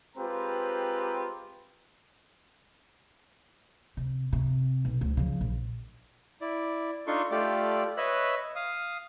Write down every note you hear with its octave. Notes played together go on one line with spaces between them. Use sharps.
G#3 C4 F4 G4 B4 A#5
C3
C3
B1
D2
C#3 F3
A#1
E4 D5
D4 D#4 F4 A4 C6 C#6
A3 F4 G4 A4 D5
B4 C#5 D#5 E5 F#6
F5 D#6